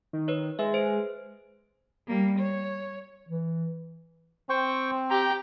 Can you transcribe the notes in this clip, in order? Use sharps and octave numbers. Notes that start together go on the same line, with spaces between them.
D#3
B4 C#5
G#3 B4 E5
C5 D7
G3 A#3
C#5
E3
C4 C5 G5 C#6
G4 G5 A#5